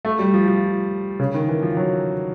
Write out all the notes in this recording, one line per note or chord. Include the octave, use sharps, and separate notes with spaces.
A3
G3
F3
F3
C#3
D#3
E3
F3
F#3